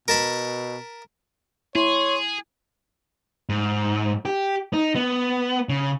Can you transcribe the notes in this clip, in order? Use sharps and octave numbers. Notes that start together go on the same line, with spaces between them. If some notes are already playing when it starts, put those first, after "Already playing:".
B2 A#4 A5 B5
E4 G#4 C#5 C6
G#2
G4
D#4
B3
C#3